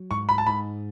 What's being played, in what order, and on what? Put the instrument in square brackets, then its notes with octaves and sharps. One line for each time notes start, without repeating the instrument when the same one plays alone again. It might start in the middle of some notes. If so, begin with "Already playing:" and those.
Already playing: [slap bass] F#3
[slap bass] G#2 [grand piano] C#6
[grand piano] B5
A5
[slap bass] G#2 [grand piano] B5